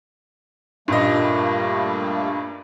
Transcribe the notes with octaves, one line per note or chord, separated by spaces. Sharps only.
G2 A#2 G3 A3 A#3 D#5